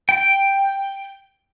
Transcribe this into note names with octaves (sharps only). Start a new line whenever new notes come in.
G5